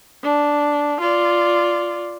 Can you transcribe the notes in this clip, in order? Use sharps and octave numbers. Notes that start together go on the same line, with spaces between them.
D4
F4 D5